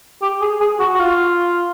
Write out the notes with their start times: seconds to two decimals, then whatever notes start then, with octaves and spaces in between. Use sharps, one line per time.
0.22 G4
0.41 G#4
0.60 G#4
0.79 F#4
0.94 F#4
0.99 F4